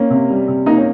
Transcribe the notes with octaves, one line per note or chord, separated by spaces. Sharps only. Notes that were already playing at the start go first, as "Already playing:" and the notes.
Already playing: A#3 C#4
C3
G3
C3
A#3 D#4
C#4